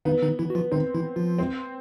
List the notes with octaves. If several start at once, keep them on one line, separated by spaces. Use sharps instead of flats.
D#3 B3 D#4
D#3 D#4
E3 E4
F#4
F3 F4
D#3 C4 D#4
E3 E4
F3 F4
C4